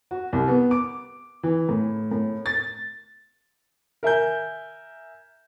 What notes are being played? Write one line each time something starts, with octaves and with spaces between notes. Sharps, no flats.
F#4
C2
B3
D6
E3
A2
A2
A6
A#4 E5 G#5 G6